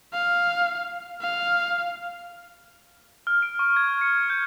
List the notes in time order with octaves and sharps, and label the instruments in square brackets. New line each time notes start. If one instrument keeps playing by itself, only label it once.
[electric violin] F5
F5
[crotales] F6
D7
C#6
G#6
C#7
D7
G6